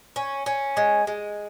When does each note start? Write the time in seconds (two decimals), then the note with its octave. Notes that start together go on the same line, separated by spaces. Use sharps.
0.16 C#4
0.46 C#4
0.77 G#3
1.07 G#3